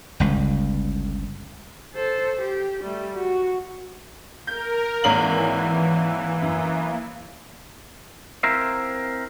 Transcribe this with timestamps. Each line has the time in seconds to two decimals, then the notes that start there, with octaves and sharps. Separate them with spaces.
0.20 G1 C#2
1.94 A4 C5
2.41 G4
2.83 G3 A3
3.15 F#4
4.47 A#4 G6
5.04 G#1 E3 A#3 C#5 F#7
6.42 F#2
8.43 C4 E4 A#4 C5 E5 F5